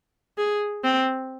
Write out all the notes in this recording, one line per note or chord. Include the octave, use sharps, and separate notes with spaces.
G#4
C4